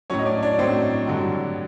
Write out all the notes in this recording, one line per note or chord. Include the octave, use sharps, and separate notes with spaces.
A2 F#3 C#4 C#5
D#5
D4 D5
D4 D5
A2 F#3 C4 C5
G2 D3 F#3